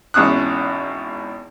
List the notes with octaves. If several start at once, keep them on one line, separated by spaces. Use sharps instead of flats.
G#1 E2 C#4 D#6 F#6